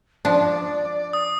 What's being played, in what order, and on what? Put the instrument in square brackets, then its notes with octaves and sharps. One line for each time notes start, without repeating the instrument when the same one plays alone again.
[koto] F3 D4 [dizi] D5
[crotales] D#6